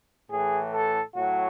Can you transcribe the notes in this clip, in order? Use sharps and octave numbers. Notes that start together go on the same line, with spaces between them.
A2 E3 G#4
A4
A2 F#3 F#4